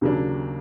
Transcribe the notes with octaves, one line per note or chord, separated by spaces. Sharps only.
D#2 C#3 F#3 A#3 D4